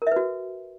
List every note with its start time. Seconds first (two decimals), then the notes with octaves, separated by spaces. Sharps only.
0.02 A#4
0.07 E5
0.12 B4
0.16 F#4